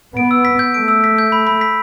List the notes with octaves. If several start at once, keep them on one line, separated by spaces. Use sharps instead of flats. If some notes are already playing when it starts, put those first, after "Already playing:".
B3 D7
E6
B6
G6
A3 D7
E6
B6
G6
B5
B5
B6